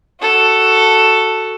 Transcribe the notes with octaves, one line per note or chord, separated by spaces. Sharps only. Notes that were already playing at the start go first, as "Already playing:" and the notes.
F#4 A4